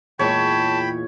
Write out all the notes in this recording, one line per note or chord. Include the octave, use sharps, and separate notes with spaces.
E2 A#2 G#3 C#5 G5 A5 B5 C#6